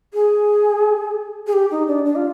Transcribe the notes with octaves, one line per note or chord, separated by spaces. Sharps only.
G#4
G#4
G4
D#4
D4
D4
F4